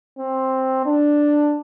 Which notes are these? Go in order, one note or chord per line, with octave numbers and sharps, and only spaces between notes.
C4
D4